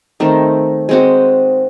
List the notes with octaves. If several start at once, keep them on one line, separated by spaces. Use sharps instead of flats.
D#3 A3 C4
G#3 C4 F#4